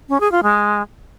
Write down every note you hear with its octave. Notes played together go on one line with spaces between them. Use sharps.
C#4
G#4
F4
G#3